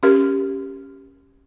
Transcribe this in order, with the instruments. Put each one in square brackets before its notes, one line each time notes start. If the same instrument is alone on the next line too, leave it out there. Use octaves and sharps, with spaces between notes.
[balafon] C#4 G4 A#4